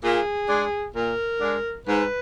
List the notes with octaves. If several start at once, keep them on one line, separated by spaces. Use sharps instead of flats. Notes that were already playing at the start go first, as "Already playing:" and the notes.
A#2 G#4
G#3 D4
A#2 A#4
G#3 D4
G#2 B4